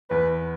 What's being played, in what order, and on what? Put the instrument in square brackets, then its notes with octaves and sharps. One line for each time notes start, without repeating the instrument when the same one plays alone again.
[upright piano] E2 [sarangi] B4